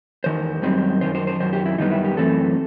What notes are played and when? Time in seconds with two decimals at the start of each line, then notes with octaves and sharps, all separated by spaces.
0.24 E2 D#3 C5
0.62 F#2 D#3 G3 C4
1.01 F#2 D#3 C5
1.15 C5
1.27 C5
1.40 F#2 D#3 C5
1.53 G4
1.66 E4
1.78 F#2 D#3 G3 B3 D#4
1.91 E4
2.05 G4
2.17 F#2 E3 A3 C4 A4